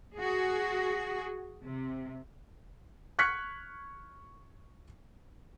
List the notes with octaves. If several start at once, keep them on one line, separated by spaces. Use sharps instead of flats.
F#4 G#4
C3
C#6 F6 F#6 G#6 B6 C#7